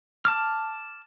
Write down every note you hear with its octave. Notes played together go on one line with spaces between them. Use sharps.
A5 D6 F6